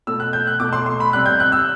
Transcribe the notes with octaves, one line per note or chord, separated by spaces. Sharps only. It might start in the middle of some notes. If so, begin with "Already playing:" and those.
B2 A3 E6
F#6
G6
F#6
B2 A3 D6
C6
C6
B5
C3 G3 F#6
G6
F#6
E6